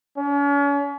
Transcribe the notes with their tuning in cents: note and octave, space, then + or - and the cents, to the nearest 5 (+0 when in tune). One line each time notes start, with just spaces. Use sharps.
C#4 +40